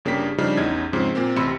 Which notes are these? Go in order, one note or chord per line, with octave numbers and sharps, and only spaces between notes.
G1 C#3 A#3 D4 G4 B6
C#3 F3 G3 D4 D#4
A1 E2 C#4 D#4 G#6
G#2 C#3 F3 C4
A#2 A#3 C4
A1 C3 B5 C6 E6 C#7